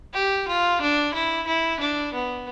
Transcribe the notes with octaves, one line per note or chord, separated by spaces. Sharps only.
G4
F4
D4
E4
E4
D4
B3